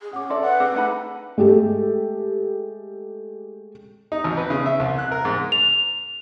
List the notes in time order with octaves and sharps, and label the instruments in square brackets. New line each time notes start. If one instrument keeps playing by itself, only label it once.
[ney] G#4
[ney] C#4 [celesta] F#5 D6
[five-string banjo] A4 D5 [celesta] E5 C6
[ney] B4 [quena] F#5
[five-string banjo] C4 [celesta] G#4 D6 E6
[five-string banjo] A3 D#4 B5 [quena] F#5
[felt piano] G#3 A3 G4 A4
[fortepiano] D#4
G#1
B4
C#3
E5
C2
F#6
A#4
G#2
[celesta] F7